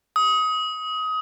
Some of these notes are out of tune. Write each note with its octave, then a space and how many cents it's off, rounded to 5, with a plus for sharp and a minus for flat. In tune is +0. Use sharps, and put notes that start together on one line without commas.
D#6 +25